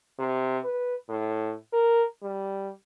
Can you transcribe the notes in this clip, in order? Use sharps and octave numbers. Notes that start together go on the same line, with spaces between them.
C3
B4
A2
A#4
G3